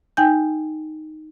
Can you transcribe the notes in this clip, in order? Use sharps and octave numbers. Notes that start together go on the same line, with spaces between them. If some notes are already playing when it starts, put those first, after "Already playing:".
D#4 G5 G#5 G6